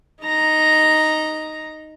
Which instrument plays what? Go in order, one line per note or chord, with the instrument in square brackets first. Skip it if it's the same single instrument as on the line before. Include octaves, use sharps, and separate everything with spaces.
[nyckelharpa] D#4 A#5